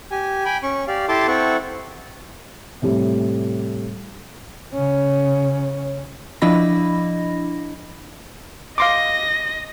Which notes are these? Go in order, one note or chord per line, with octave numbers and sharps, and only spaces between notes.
G4 G#5
G5 G#5 B5
C#4 C#6
G4 D5 F5
E4 G4 A4 A5 C6 D6
C4 E4 A4 F#5 C#6
A2 C3 G3 A3
C#3 C#4
F3 D4 E4 D#5 B5 A#6
D#5 F5 C6 D6 A#6